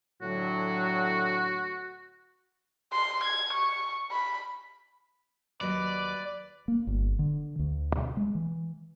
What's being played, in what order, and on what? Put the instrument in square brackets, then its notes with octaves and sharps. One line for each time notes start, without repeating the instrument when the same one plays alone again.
[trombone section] A2 D3 F#3 [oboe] F#4
[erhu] C6
G#6
C#6
B5
[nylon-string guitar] D#2 F#3 D#5 [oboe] B4 [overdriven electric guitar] D5
[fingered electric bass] A#3
G1
D3
D2
B2
G#3
E3